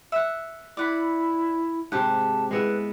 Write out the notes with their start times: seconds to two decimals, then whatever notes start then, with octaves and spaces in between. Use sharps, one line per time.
0.12 E5 F#5
0.77 E4 D5 F#5 B5
1.92 G#2 C3 G4 F#5 A5
2.51 G#3 B3 E4 B4